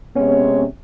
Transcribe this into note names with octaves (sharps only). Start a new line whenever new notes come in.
C3 G#3 B3 C#4 C#5